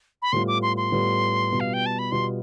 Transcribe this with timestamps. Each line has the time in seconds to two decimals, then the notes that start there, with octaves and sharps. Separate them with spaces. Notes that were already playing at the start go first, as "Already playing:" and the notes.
0.22 B5
0.32 A2 G3 B3 F4 C6
0.48 D6
0.62 C6
0.77 C6
0.92 A2 G3 B3 F4
1.52 B2 G3 B3 F4
1.60 F5
1.73 G5
1.86 A5
1.99 B5
2.12 B2 G3 B3 F4 C6